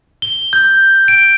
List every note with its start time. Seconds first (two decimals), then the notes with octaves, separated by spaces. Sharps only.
0.22 G7
0.53 G6
1.08 D7